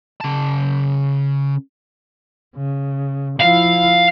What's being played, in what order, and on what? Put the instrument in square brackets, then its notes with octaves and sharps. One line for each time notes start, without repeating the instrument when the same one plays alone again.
[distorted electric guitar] C#3 A5
[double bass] C#3
[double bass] F3 E4 [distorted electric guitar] F5